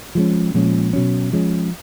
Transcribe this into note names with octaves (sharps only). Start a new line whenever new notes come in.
F3 G#3 C#4
A#2 F3 G#3 C#4
B2 F#3 C#4
F3 G#3 C#4